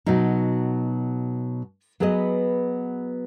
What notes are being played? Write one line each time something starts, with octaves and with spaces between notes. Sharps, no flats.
B2 F#3 D#4
F#3 B3 G#4 B4 D#5